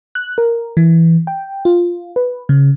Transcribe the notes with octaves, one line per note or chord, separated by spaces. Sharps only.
F#6
A#4
E3
G5
F4
B4
C#3